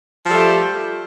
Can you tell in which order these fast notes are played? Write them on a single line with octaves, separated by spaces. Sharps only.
F3 G3 A4 A3 G4